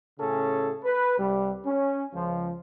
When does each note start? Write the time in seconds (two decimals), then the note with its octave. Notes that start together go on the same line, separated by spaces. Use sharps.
0.18 A2 C#3 C#4 G#4 A4
0.84 B4
1.18 C2 G3
1.65 C#4
2.14 C#2 F3